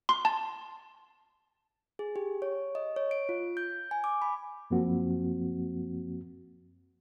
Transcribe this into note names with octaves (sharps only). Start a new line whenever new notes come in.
C6
A5
G#4
G4
C#5
D#5
C#5
D7
F4
G6
G#5
D6
B5
F#2 F3 A#3 C4 F#4